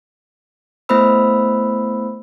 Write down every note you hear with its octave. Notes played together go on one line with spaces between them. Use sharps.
A3 B3 E4 C5 B5 E6